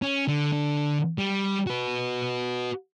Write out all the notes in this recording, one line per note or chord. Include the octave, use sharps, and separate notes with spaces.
C#4
D3
D3
G3
F#4 B4